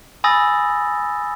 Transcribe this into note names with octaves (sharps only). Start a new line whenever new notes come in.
G#5 B5 D#6 E6 A6 A#6